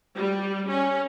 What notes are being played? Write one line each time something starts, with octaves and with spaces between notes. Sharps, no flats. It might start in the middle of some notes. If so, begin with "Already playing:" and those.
G3
C#4